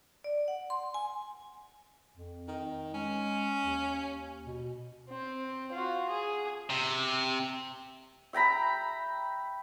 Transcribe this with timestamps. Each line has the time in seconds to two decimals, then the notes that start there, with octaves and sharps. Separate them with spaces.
0.24 D5
0.48 F#5
0.70 C6
0.94 G#5
2.16 F2
2.47 D#3
2.93 G#3 C#4
3.64 D#2
4.46 B2
5.09 C4
5.72 F4 F#4
6.09 G#4
6.70 C3
8.33 E5 G5 A#5 B5